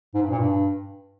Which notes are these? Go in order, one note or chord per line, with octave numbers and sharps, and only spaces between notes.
G#2
G2
A#2
G2